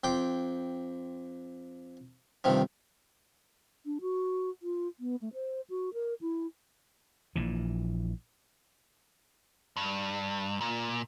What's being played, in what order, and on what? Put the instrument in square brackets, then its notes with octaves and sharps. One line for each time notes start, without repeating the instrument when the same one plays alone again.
[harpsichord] F2 G5 C6 D6
G2 C3 D#3 F3
[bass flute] D4
F#4
F4
B3
A3
C5
F#4
A#4
E4
[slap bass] A#1 A#2 E3
[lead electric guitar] G2
A#2